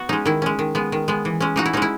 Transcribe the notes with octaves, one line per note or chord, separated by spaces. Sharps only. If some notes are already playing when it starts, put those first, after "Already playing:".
Already playing: B3 F#4
G#3 C#4 D#4
D#3 E4
G#3 C#4
D#3
G#3 B3
D#3
G#3 B3
E3
G#3 C#4
E3 D#4 F#4
E4
G#3 C#4 D#4
E4